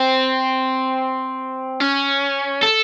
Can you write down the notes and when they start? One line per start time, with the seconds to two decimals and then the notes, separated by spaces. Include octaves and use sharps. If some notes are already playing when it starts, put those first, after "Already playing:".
Already playing: C4
1.80 C#4
2.63 A4